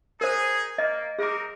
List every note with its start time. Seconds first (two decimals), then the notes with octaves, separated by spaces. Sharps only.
0.21 D#4 G#4 A#4 C5
0.78 A#3 D#5
1.19 C4 D#4 G#4 A#4 D6